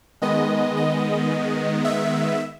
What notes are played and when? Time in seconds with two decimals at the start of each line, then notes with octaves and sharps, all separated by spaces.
0.22 D#3 G#3 B3 D#5
0.77 D#5
1.85 E5